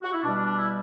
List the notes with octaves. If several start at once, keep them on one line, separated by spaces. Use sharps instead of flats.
F#4
E4
B2 G3 D4
D4
D4
E4